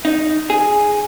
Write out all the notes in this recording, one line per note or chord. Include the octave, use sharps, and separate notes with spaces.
D#4
G#4